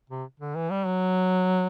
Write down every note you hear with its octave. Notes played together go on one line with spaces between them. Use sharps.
C3
D3
E3
G3
F#3